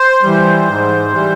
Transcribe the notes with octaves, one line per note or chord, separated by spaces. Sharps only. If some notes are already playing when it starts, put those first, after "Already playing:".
Already playing: C5
E3 G3
G#2
E3 G3